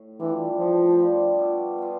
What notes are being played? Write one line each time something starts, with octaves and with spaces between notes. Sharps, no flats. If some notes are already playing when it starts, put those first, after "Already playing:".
Already playing: A2
E3 G3 D4 F4
A2 F3
G3 D4 F4
B2
B3 F4